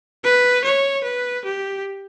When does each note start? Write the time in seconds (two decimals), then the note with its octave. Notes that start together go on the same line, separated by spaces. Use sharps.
0.24 B4
0.64 C#5
1.04 B4
1.45 G4